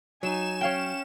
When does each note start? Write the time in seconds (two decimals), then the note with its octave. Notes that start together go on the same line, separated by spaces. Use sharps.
0.23 F#3 D#4 G#5 E7
0.61 C#4 C#5 F5 G5